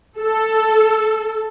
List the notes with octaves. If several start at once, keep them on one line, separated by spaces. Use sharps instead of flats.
A4